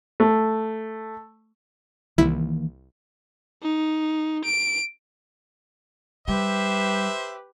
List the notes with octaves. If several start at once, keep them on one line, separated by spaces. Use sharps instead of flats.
A3
C2 D#3 E3 A#3 E4 B6
D#4
D7
G3 G4 B4 C5 E5